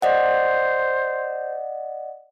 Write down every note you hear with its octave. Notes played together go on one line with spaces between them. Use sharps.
C5 D5 D#5 F#5